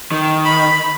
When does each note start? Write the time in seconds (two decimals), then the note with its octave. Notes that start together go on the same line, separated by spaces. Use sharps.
0.12 D#3
0.43 B5